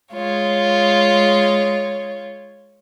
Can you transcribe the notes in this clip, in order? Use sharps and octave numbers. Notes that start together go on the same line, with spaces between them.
G#3 F4 C#5